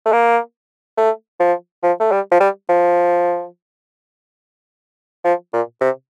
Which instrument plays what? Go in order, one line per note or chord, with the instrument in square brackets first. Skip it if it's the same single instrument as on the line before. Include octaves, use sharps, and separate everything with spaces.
[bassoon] A3
A#3
A3
F3
F3
A3
G3
F3
G3
F3
F3
A#2
C3